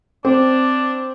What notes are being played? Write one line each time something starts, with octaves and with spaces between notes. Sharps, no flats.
C4 D4